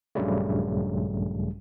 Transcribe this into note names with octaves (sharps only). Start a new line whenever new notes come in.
A#1 G2 C#3 F#3 G3 A3